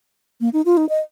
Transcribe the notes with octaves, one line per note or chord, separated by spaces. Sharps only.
A#3
D#4
F4
D#4
D#5